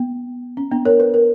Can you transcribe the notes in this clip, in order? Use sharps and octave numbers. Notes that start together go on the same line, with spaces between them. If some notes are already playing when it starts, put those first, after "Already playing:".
Already playing: B3
C#4
B3 D4
A#4 C#5
B4
A#4